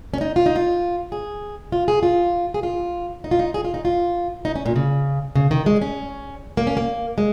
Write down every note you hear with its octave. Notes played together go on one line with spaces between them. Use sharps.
C#4
D#4
F4
D#4
F4
G#4
F4
G#4
F4
G#4
F4
D#4
F4
D#4
G#4
F4
D#4
F4
D#4
C#4
A#2
C#3
C#3
D#3
G#3
C#4
A#3
C#4
A#3
G#3